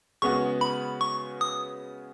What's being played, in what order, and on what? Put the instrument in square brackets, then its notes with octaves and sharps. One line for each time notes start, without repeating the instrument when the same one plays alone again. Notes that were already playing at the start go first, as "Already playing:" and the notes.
[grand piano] C#3 G#3 B3 F#4 [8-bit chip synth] C#6
[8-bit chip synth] B5
C#6
D#6